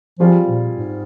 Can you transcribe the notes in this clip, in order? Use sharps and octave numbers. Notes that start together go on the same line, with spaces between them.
F3 G3 C4 F4 G#4
A#2
G#2